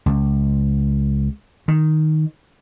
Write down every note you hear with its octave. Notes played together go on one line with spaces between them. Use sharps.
C#2
D#3